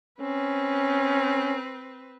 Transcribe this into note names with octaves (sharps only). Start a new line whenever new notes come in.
C4 C#4 B4